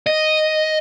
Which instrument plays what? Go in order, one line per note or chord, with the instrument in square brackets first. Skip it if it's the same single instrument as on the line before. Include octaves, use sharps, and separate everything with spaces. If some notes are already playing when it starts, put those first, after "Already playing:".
[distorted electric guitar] D#5